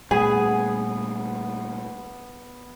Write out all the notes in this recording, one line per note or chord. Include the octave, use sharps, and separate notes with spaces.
A#2 G3 A3 B3 G#4